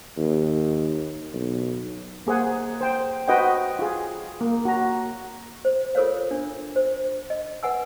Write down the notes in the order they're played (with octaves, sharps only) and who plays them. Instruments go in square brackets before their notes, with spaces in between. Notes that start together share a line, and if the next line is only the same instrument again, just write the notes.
[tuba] D#2
B1
[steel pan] A#3 G#4 C5 F#5
C5 G5
F#4 B4 C5 D#5 F#5 G5
F4 G#4
A#3
F#4 A#5
[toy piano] C5
F4 A4 A#4 C5 C#5 F5
D4
C5
D#5
B4 F#5 G#5 E6